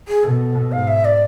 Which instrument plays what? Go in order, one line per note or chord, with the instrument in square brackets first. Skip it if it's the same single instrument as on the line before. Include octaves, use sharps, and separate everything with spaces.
[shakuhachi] G#4
[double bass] B2 [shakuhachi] A4
[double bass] G#2 [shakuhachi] F5
[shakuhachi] E5
D5